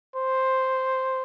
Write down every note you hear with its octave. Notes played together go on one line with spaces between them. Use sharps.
C5